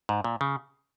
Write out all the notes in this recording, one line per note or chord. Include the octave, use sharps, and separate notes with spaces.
G#2
A#2
C#3